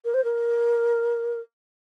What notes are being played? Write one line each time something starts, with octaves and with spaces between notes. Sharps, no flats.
A#4
C5
A#4